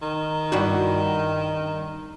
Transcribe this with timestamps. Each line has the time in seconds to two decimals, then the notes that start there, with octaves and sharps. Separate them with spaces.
0.02 D#3
0.52 G2 E4 F#4